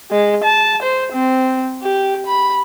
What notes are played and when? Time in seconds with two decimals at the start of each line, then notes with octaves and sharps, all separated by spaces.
0.11 G#3
0.44 A5
0.83 C5
1.13 C4
1.83 G4
2.26 B5